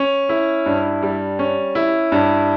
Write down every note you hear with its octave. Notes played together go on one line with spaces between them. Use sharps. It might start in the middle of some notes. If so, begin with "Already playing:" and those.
Already playing: C#4
E4
G2
G3
C#4
E4
G2